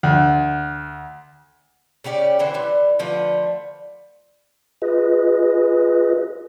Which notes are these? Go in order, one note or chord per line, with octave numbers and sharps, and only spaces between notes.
D2
C#3 C#4 G4 D5
D3 E3 C5
E3 G3
D3 F3 A3 B4
F4 G#4 B4 D#5